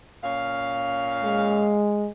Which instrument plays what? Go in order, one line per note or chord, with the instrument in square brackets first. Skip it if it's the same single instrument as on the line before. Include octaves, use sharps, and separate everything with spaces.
[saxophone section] A#2 C#4 F5
[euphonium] G#3